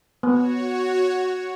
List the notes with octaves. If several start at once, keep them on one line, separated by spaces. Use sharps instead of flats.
B3 F#4 C#5